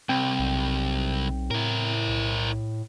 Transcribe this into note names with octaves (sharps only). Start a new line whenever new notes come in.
C2 C4 G5
B1
A2 E4 A#4
B1